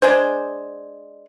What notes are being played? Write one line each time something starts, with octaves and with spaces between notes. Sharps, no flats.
G#3 D4 G#4 C5